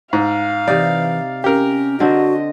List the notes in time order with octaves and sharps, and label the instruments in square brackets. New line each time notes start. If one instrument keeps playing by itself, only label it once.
[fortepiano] G#2 [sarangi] F5
[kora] C3 D#4 [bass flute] E3 [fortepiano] D5
[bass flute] C#4 [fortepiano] G4 A#4
[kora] D3 C4 D4 [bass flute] F#4 [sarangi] D#5